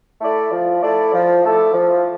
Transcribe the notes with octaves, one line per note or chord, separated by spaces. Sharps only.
A3 E4 A4 D5
F3
A3 E4 A4 D5
F3
A3 E4 A4 D5
F3